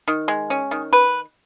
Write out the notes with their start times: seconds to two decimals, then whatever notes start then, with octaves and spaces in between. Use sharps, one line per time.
0.08 D#3
0.28 G#3
0.50 C#4
0.71 D#3
0.93 B4